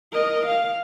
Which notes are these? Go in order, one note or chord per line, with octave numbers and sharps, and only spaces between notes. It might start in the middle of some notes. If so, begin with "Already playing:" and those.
A#4 D#5
F5